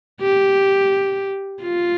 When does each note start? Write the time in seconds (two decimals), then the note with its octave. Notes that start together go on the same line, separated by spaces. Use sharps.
0.21 G4
1.62 F4